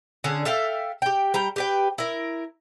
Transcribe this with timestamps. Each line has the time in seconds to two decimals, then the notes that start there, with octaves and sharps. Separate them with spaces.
0.24 D3 C#4 G#4
0.45 A4 E5 F5 G5
1.02 G4 G5
1.34 G3 G5 A#5
1.56 G4 B4 G5
1.98 E4 A#4